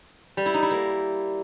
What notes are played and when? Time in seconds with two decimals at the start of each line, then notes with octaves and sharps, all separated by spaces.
0.37 G3
0.46 E4
0.54 D#4
0.62 E4
0.71 A#3